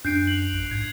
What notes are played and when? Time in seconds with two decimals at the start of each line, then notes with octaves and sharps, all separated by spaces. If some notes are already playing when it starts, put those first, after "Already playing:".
0.04 F#2 D4 F#6 G6 C7 D7
0.27 F7 F#7
0.53 A#1
0.71 G#2 G#6